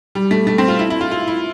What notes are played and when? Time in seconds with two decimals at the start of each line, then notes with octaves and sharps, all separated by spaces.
0.15 G3
0.31 A3
0.47 A3
0.58 C4
0.68 F4
0.79 E4
0.90 E4
1.01 F4
1.11 F4
1.27 E4